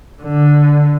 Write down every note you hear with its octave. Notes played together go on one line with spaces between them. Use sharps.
D3